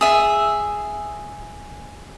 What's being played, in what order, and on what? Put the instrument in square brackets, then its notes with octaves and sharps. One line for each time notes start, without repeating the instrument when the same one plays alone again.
[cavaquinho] G#4 E5